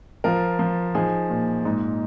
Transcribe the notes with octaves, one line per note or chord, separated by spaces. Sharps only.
F3 F4 A#4
F3
F3 D#4 G#4
A#2
G#2 D#4